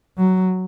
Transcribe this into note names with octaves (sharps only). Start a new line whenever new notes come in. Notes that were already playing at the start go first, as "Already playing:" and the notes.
F#3